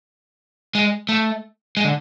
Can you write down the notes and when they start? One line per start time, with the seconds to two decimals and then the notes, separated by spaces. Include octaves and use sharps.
0.75 G#3
1.09 A3
1.77 G#3
1.84 D3